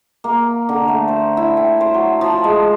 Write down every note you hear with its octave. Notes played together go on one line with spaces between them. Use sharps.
A#3
D3
A3
C5
E4
G5
C5
F#3
F3
G#3